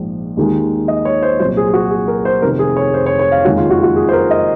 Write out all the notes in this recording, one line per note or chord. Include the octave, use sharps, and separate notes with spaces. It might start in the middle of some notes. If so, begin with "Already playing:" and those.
Already playing: A#1 G#2 F3 G#3
D#2 D#3 G#3
D#5
C#5
C5
C2 A#2 F#3 C5
G#4
G#4
F#4
G#4
A#4
C5
F1 F2 C3 D#3 A#4
G#4
C#5
C5
C#5
C#5
F5
F#1 F2 D#3 G#3 F#4
F4
F#4
F#4
G#4
C5
A#4
D#5